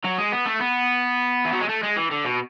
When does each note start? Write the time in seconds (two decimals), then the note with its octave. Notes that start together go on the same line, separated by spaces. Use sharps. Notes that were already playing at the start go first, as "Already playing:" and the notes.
0.05 F#3
0.18 G#3
0.32 B3
0.45 A3
0.60 B3
1.46 E3
1.53 F#3
1.62 G#3
1.69 A3
1.83 G#3
1.97 E3
2.11 D3
2.25 B2